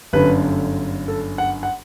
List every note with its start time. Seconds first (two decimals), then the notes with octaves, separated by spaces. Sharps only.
0.13 G1 F#2 D3 B4
1.08 A4
1.38 F#5
1.63 F#5